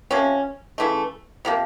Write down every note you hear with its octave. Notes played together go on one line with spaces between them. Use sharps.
C3 F3 A#3 C#4
C#3 E3 A3
C3 F3 A#3